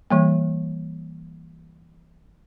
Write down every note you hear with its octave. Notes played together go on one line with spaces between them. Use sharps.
E3 G3 A#3